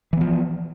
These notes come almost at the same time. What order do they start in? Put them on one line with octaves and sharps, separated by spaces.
E3 B3 F3